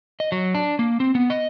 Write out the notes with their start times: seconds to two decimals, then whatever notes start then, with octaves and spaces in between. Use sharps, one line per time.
0.20 D#5
0.32 F#3
0.54 D4
0.79 A#3
1.00 C4
1.15 B3
1.30 D#5